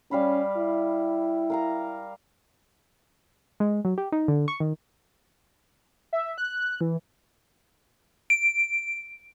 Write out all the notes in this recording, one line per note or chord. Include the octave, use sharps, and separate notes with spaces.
G3 C#4 F5 B5
E4
A#4 F5 A#5
G#3
F#3
G4
D#4
D3
C#6
D#3
E5
F#6
E3
D7